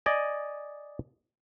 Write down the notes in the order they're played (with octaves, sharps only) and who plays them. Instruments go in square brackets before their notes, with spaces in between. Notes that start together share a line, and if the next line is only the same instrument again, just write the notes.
[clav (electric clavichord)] D5 D#5 G#5